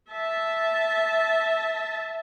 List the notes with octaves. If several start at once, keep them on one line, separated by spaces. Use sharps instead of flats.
E5 A5